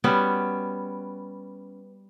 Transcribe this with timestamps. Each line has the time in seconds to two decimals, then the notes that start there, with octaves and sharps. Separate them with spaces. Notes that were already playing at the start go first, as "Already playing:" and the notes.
0.04 G3 B3 C#4 F#4